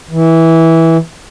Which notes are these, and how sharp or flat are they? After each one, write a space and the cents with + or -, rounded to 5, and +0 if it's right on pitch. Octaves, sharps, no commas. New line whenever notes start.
E3 -10